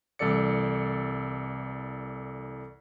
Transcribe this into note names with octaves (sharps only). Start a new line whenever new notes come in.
C2 E3 A4 D5 C#7